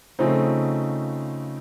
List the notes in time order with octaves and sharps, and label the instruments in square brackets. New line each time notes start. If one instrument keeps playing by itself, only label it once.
[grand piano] C#3 F3 A3 C4 D#4